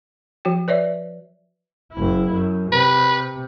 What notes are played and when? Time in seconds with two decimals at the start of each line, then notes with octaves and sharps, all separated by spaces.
0.45 F3 F#4 G5
0.68 B4 C#5 D5 E5
1.92 F#1 E4
2.33 F#2
2.72 C3 B4